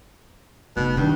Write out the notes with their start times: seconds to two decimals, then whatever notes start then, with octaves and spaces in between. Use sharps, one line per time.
0.76 F1 B2
0.97 G2 D#3